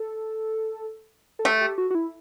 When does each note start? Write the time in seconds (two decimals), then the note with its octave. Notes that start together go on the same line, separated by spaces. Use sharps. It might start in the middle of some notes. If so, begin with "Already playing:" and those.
Already playing: A4
1.39 A4
1.45 A3 G4
1.61 G4
1.78 F#4
1.91 F#4
1.95 E4